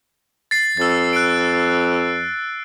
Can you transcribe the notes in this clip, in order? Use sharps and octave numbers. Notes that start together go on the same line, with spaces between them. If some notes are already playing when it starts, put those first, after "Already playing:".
A6 C7
F2 E6 A6
F#6 D7